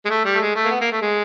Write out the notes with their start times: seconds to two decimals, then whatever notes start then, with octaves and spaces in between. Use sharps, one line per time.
0.05 G#3
0.10 A3
0.25 G3
0.34 A3
0.40 G#3
0.55 A3
0.65 A#3
0.71 B3
0.81 A#3
0.92 A3
1.02 G#3